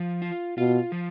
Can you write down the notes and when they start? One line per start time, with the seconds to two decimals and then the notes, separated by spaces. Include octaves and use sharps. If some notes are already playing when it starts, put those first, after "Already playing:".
Already playing: F3
0.22 F4
0.58 B2 F4
0.92 F3